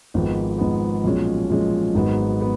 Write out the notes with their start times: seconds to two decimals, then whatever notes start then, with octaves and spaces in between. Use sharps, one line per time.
0.14 G#1 G#2 F3 B3
0.58 G#1 G#2 F3 B3
1.04 B1 A#2 F3 G#3 C#4
1.50 B1 A#2 F3 G#3 C#4
1.94 G#1 G#2 F#3 B3 D#4
2.41 B3